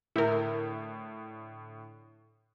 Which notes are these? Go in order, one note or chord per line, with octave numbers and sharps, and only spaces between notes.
A2 D3 E4 A#4 G6